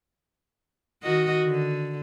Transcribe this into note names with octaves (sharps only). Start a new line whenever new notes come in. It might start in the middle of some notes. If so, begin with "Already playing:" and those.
D#3 F#4 D#5
D3